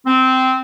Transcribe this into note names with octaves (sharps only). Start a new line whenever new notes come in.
C4